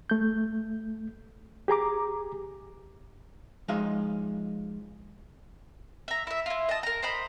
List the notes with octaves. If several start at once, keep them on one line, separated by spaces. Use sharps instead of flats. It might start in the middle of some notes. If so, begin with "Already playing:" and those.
A3 G6
G4 G#4 A#5 D6
F3 G#3 D#4 G#4 E5 F5
E5 A#5
E4 E5
E4 F4
D#5 A5
A#4 A#5
C5 D#5 A#5 B5